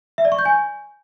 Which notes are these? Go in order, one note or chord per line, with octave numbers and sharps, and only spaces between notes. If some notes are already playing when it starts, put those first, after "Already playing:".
E5
D5
C#6
G6
G#5